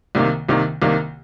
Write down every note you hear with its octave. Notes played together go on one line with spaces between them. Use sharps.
C2 C3 D#3 A#3
C2 C3 D#3 A#3
C2 C3 D#3 A#3